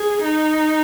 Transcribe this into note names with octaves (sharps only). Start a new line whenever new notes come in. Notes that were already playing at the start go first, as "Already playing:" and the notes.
Already playing: G#4
D#4